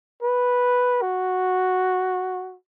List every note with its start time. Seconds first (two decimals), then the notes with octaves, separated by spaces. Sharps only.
0.22 B4
1.02 F#4